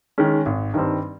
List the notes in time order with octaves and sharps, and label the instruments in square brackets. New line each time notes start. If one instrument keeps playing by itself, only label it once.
[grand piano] D#3 G#3 C#4
G#1
G2 D#3 G3 C4